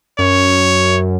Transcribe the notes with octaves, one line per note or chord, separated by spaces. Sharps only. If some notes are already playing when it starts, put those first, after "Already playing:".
F#2 C#5